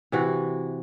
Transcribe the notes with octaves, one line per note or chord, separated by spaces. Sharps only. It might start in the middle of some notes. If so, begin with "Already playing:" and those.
C3 E3 F#4